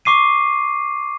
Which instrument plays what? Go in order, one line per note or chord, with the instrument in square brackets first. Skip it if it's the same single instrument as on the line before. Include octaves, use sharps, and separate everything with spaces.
[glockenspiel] C#6 D6 C7 D#7